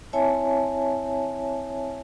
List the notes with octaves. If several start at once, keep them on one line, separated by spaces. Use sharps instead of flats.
C4 E4 C#5 E5 G#5 A5